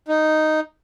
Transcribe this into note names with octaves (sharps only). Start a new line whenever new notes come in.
D#4